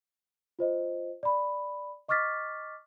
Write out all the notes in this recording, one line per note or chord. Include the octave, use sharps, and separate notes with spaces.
F4 C5 D#5
D5 B5
D#5 C#6 D6 F6 A6 B6